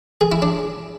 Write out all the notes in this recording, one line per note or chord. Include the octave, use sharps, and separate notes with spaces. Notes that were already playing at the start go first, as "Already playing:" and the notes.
G#4
E4
D4